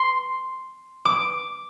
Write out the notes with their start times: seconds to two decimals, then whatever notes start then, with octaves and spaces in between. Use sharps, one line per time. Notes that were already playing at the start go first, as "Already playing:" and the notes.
Already playing: C6
1.05 D6